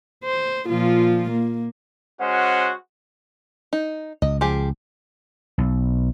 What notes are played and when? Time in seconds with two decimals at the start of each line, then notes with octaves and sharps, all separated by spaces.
0.24 C5
0.67 A#2 F3 F4
1.31 A#3
2.21 G#3 C#4 F#4 C5 F#5
3.73 D#4
4.22 C#2 D#5
4.41 F3 G4 G#4
5.58 B1